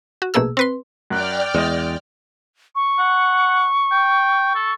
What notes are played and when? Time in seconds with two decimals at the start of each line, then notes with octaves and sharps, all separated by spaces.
0.22 F#4
0.34 A#1 B2 A3 A#3 G#4 E6
0.57 C4 B4 C6
1.10 F#2 D5 G5 F6 F#6
1.55 E2 G#3 D#5
2.75 C#6
2.99 F#5
3.92 G5
4.55 A4